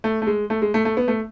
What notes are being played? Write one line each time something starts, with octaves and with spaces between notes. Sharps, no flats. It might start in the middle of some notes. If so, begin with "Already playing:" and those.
A3
A3
G#3
A3
G#3
A3
A3
B3
A3